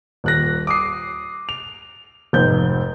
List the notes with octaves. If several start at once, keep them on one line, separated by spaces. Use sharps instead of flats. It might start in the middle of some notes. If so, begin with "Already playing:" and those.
D#1 F#6 A#6
D6 D#6 C7
F7
F1 G#2 G6